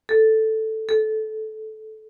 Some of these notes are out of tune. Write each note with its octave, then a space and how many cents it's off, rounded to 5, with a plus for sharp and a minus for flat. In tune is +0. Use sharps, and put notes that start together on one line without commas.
A4 +0
A4 -15